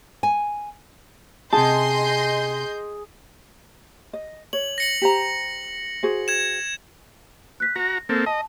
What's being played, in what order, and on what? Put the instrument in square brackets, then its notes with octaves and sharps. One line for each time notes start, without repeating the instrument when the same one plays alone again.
[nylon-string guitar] G#5
[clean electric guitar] C3 A5 [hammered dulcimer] G#4 [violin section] D#5 C6 G6
[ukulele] D#5
[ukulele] C#5 [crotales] F#7
[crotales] A#6 C#7 F#7
[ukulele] G4 C5 A#5
F#4 G#4 C5
[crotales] G#6 E7
[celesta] F#6 B6
[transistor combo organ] F#4 A#5 [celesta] A#6
[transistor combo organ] A#3 C4 A4
[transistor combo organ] D#5 [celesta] A5